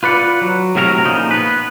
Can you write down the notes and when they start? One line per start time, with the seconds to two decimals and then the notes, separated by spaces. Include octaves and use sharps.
0.03 F4 B4 D5 F#5
0.41 F#3
0.75 A2 C3 F#3 A#4 D#5 A#5
1.04 A#2 C#3 F3 D#4
1.31 B3 B4